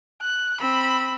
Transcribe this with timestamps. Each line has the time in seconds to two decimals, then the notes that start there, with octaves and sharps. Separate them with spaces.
0.22 F#6
0.61 C4 B5 E6